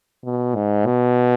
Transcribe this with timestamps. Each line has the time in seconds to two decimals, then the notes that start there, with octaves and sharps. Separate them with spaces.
0.25 B2
0.56 G#2
0.86 B2